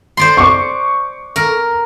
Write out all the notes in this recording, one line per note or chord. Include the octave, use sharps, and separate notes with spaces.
C5 D5 C6
C#6 D6
A#4